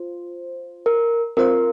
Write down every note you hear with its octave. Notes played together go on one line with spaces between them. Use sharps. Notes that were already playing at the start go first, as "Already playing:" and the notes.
Already playing: F4 C5
A#4
C4 F4 A#4 C5 F5